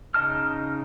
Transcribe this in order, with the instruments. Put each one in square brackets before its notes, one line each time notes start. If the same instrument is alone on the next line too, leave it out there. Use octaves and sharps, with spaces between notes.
[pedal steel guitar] C#3 D#4 D#5 A5 F6